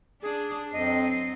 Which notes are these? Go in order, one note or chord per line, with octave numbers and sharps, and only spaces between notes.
D4 G#4
F2 F#3 C4 D#5 C7